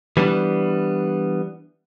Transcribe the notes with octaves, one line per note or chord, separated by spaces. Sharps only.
E3 G3 B3 D4